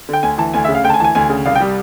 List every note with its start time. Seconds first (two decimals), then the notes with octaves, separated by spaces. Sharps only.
0.09 D3 G5
0.23 D2 G#5
0.38 E3 A5
0.54 D2 G#5
0.65 E5
0.68 C#3
0.75 F5
0.84 D2 G5
0.90 A5
0.94 G#5
1.00 E3 A5
1.04 G#5
1.15 D2 G#5
1.29 C#3
1.45 C2 F5
1.55 G5
1.60 G3